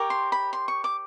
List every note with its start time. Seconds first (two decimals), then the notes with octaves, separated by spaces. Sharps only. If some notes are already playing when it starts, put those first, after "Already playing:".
Already playing: G4 A#4 C#5
0.10 C6
0.32 B5
0.53 C6
0.68 C#6
0.84 D6